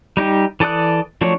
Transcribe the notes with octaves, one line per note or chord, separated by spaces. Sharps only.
G3 D#4 G4
E3 A4 D5 D#6 F#6
F3 F#3 A3 D4 C#5